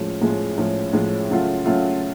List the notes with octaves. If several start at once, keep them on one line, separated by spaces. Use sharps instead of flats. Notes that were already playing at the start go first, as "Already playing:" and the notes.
Already playing: A2 F3 G#3 C#4
A2 F3 G#3 C#4
A2 F3 G#3 C#4
A2 F3 G#3 C#4
C#3 F#3 A3 F4
C#3 F#3 A3 F4